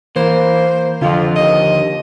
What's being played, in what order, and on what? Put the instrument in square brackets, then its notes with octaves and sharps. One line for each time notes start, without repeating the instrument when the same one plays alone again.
[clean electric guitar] E3 [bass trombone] A#3 [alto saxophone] C5
[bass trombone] F2 [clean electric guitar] D3 F3 [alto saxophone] F4
[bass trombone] D#2 [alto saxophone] D#5